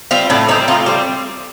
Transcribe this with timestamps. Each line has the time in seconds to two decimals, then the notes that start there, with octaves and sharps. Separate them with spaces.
0.11 G3 C4 F4
0.30 A2 D4
0.49 G3 C4 D#4
0.68 A2 F4
0.86 G3 C4